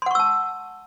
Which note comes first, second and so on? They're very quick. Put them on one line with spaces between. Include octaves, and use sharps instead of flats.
C6 F#5 C#6 E6 A5